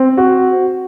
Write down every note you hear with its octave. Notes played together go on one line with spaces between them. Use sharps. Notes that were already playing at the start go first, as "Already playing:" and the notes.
Already playing: C4
F#4